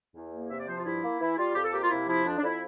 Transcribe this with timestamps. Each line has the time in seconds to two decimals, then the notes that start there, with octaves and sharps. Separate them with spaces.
0.15 E2
0.33 A#3
0.50 C3 E5
0.59 D5
0.67 F3 C5
0.77 F4
0.85 G2 E4
1.03 A#3
1.20 E3 E4
1.38 G3 F4
1.55 F2 G4
1.64 A4
1.73 A#3 G4
1.82 F4
1.90 C3 E4
2.08 F3 E4
2.25 F2 D4
2.38 D4
2.42 F2 E4